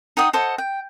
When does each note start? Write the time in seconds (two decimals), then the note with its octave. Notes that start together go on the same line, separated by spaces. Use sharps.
0.17 D#4 F#5 G5 D#6
0.33 A4 C5 D#5 F#5
0.58 G5